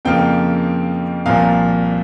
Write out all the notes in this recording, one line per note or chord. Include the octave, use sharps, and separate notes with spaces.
F2 C#3 F3 A#3 G5
C2 A#2 F3 A#3 F5